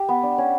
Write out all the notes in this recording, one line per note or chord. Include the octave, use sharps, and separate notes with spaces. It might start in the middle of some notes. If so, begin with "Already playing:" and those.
Already playing: G4
B3
D4
C#4